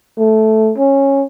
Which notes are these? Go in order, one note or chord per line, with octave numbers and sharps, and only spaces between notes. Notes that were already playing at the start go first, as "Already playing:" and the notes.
A3
C#4